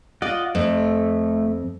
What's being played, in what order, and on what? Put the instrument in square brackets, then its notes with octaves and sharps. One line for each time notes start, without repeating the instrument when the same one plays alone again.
[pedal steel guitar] F4 D#5 F#5 [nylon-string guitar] D5
[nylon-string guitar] F2 [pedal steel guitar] A3